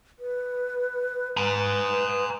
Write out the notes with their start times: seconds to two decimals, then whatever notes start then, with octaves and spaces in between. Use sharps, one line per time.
0.19 B4
1.37 B4 G#5 A#5